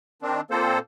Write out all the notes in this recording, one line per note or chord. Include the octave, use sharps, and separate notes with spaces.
D#3 C4 D4
A#2 A#3 C4 A4 C5